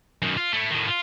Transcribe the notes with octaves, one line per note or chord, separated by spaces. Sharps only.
F#2 D#3
F4
A3 E4
A2 D#3
F4